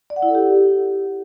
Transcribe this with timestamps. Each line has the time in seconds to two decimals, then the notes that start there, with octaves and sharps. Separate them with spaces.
0.10 D5
0.16 F#5
0.22 E4
0.29 A4
0.35 G4